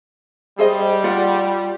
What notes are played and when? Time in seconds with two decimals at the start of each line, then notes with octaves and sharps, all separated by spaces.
0.59 G3 G#4 C5 D#5
1.04 F4 D5 F#5